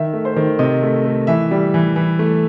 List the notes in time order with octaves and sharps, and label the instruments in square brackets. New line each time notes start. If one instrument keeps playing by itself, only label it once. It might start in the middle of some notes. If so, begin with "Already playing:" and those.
Already playing: [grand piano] D#3 E5
A3
C5
D#3
C3 D#5
A3
A3
E3 E5
G3
E3
E3
A3